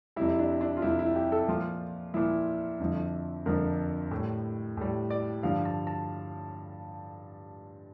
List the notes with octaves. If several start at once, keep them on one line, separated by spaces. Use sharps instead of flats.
F2 C3 G3 E4
D4
D4
F4
F2 C3 G3 E4
E4
G4
A4
A#2 F3 F4
A#2 F3 E4
F2 D3 F3
F2 D3 F3 A#4
A2 G3
A2 G3
D5
G2 D3 F3 F5
A5
A5